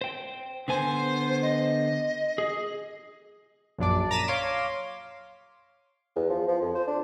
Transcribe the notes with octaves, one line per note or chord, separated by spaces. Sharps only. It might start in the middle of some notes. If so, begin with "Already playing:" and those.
C5 G5
D3 B3 C5 G#5
D#5
G#4
A#1 F#2 D4 D5
A#5 A6 B6 D#7 E7
C#5 F5 C6 D6
E2
F3
F3
F2
C5
D4